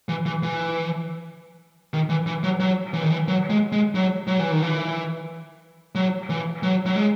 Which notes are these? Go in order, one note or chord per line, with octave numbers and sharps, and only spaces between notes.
E3
E3
E3
D#3
E3
E3
F#3
F#3
E3
D#3
E3
F#3
G#3
G#3
F#3
F#3
E3
D#3
E3
F#3
E3
F#3
F#3
G#3